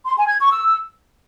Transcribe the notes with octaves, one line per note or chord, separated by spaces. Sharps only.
C6
G#5
G#6
C#6
E6